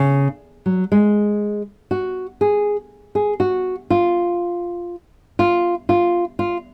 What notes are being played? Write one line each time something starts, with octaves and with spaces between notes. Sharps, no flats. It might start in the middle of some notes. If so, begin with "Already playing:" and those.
Already playing: C#3
F#3
G#3
F#4
G#4
G#4
F#4
F4
F4
F4
F4